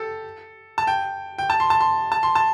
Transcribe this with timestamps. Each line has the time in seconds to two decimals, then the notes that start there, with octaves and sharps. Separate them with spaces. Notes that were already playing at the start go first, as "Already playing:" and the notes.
Already playing: G4 A4
0.78 A5
0.87 G5
1.38 G5
1.50 A5
1.60 C6
1.70 A5
1.81 C6
2.12 A5
2.23 C6
2.35 A5